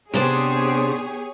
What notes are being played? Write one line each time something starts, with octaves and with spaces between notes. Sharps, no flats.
C3 B3 D4 G4 G#4 C5 C#5